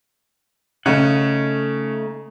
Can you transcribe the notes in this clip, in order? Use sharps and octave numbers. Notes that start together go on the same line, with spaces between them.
C#3 A3 D#4 F#5